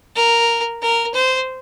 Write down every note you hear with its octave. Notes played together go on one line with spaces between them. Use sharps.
A#4
A#4
C5